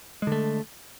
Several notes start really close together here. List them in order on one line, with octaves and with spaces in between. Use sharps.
G#3 D3 A3